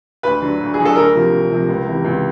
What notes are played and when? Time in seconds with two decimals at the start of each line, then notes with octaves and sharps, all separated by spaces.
0.23 D2 B4
0.42 D3 F#3
0.61 D2
0.74 G#4
0.79 D3 F#3
0.85 A4
0.96 D2 A#4
1.15 C3 F3
1.32 D2
1.51 C3 F3
1.69 C#2
1.87 C3 E3
2.04 C#2